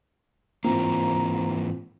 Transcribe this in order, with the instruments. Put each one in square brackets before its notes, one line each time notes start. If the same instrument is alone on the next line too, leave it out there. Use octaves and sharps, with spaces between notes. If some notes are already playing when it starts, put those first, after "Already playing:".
[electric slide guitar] G#2 E3 A#3 [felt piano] C4 F4 [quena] A#5